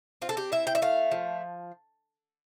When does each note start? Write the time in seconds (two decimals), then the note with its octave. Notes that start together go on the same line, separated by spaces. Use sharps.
0.22 C4 F4
0.29 A4
0.37 G4
0.52 E4 E5
0.67 G5
0.75 E5
0.82 A3 F5
1.12 F3